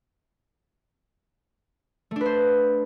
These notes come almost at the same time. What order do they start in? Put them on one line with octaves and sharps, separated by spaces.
A3 D4 B4 C5